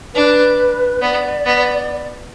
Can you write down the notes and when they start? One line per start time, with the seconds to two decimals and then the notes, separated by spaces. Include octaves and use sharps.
0.14 D4 B4
1.02 B3 D5
1.46 B3